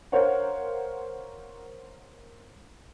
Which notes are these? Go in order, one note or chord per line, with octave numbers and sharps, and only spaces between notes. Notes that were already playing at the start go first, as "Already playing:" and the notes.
A#4 C5 C#5 F5 F#5